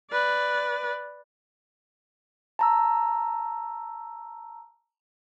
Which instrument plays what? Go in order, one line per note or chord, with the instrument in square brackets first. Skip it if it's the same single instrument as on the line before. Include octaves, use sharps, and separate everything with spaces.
[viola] B4 D5
[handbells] A5 A#5 E6